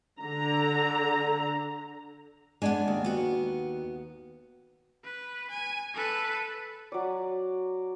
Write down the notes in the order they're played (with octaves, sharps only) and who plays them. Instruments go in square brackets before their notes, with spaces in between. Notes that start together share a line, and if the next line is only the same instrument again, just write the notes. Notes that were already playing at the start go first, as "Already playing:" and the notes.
[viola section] D3 A#5
[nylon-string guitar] G#3 D4 [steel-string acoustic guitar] B3 D5 G#5
[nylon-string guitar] D#2
[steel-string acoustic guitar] B3 F#4
[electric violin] B4
G#5
A4 B4
[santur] F#3 D5